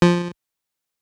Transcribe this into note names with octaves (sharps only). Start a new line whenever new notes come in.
F3